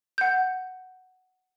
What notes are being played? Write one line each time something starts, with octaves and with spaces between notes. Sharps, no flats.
F#5 G6